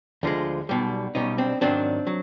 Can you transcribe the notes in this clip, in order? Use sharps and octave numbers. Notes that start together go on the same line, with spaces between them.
D2 D3 F3 G#3
B1 B2 G3
B1 B2 G3 C#4 D#4
C4 D4
G#2 D#3 F#3 C4 D4
F#3